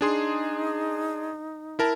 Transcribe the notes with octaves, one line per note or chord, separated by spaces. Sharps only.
D4 D#4 G#4 C6
E4 A#4 A5